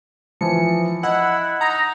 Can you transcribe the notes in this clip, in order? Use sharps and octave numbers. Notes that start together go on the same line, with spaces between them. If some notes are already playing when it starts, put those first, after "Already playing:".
E3 F3 C#7
E4 D#5 F#5
D#4 A#5